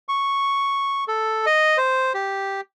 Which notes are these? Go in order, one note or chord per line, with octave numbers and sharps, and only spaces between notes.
C#6
A4
D#5
C5
G4